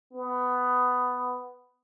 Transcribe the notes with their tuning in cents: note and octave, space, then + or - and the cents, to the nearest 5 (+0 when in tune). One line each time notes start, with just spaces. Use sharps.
B3 +10